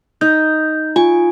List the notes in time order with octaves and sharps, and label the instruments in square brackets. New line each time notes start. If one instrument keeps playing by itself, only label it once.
[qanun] D#4 [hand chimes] G6
[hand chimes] F4 G#5 [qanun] C#6